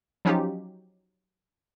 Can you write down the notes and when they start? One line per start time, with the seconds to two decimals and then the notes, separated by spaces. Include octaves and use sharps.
0.25 F3 F#3 C#4 D#4 F4 G4